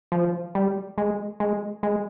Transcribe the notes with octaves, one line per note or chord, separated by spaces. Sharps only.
F3
G3
G#3
G#3
G#3